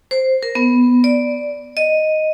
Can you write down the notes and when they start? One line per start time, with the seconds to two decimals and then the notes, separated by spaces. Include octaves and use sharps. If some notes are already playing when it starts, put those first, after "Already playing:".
0.11 C5
0.43 A#4
0.55 B3
1.04 D5
1.77 D#5